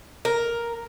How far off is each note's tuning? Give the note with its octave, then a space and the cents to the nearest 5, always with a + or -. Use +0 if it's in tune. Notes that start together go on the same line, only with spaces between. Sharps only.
A#4 +5